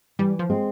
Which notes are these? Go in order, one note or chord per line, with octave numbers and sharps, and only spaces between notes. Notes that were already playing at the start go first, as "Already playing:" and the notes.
E3 G3
F3
G#3 C4